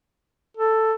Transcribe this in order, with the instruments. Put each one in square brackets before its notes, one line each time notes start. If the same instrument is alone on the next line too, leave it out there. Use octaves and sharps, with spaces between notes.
[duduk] A4